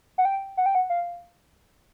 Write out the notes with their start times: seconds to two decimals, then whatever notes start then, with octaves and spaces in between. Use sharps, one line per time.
0.18 F#5
0.25 G5
0.57 F#5
0.66 G5
0.75 F#5
0.90 F5